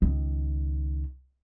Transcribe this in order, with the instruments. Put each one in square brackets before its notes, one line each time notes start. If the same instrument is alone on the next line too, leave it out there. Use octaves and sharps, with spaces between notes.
[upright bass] C#2 D#3